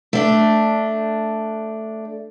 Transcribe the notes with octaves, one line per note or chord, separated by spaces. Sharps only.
A3 D4